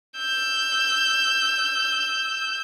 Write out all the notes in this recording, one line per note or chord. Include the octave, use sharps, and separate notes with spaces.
E6 G6